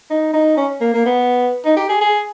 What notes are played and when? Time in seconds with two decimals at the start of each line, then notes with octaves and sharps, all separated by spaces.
0.10 D#4
0.33 D#4
0.57 C#4
0.81 A#3
0.94 A#3
1.06 B3
1.65 D#4
1.77 G4
1.89 G#4
2.01 G#4